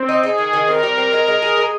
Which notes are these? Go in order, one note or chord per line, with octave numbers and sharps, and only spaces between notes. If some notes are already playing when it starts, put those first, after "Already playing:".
Already playing: C4
D#4
D#4 G#4
D#3
D#3
C4 A#4
G3
C4
G#3
G#3
G#4
G#3